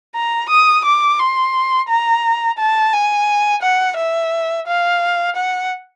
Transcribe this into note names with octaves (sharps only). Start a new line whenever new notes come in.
A#5
D#6
D6
C6
A#5
A5
G#5
F#5
E5
F5
F#5